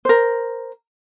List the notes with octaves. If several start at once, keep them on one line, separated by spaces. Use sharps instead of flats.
A#4 C5